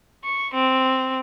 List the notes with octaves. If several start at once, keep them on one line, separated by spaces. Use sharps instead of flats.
C#6
C4